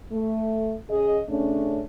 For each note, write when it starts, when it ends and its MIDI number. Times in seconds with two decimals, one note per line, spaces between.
0.12 0.76 57
0.90 1.21 49
0.90 1.21 68
0.90 1.21 75
1.29 1.83 49
1.29 1.83 57
1.29 1.83 61
1.29 1.83 62